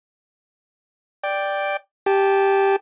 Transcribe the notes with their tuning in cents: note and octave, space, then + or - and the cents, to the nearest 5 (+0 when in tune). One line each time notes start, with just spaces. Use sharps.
D5 +0 G5 +0
G4 +0 A5 -20